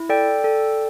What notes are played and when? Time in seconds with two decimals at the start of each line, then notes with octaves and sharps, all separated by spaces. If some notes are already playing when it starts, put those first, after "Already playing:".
Already playing: E4
0.09 A4 D5 G5
0.44 A4